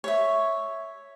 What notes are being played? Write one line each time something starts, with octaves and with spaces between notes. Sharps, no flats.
C#5 E5